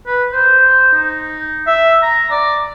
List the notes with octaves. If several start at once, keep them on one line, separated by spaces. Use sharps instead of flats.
B4
C5
D#4
E5
A#5
D5